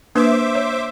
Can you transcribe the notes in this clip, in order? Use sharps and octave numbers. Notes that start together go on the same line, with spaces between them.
A#3 D4 B4 C5 E5 D6
C#5